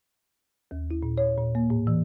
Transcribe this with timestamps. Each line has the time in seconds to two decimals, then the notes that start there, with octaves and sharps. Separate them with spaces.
0.71 D#2
0.91 E4
1.03 A#2
1.18 C#5
1.38 A#2
1.55 A#3
1.70 A2
1.87 E3